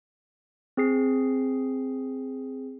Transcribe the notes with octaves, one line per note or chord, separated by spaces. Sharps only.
C4 G#4 C7